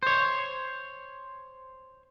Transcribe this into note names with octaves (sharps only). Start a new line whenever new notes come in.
C5 C#5